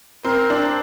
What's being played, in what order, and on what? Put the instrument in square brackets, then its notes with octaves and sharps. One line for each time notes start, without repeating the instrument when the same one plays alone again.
[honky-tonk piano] C4 [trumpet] A#4
[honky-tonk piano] D4